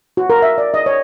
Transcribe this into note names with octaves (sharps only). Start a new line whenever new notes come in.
F#4
A#4
E5
D5
D#5
C#5